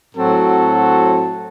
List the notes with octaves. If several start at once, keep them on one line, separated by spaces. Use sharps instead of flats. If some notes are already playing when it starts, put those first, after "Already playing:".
A2 F#3 C4 F#4 A4